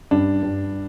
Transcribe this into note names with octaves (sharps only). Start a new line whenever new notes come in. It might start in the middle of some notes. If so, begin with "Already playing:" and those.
G2 D4
G2